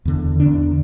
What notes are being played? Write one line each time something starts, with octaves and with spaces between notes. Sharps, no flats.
E2 D3
E2 D3 D4